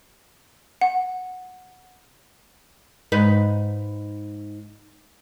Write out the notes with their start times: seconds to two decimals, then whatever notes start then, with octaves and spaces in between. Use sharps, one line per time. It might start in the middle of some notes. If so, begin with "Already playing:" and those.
0.81 F#5
3.12 G#2 D#4 B4